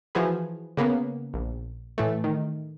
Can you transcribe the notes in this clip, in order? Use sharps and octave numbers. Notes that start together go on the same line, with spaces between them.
E3 F3 F#4 G#4 B4
C#3 A#3 B3
A#1
A2 E3 A3
D#3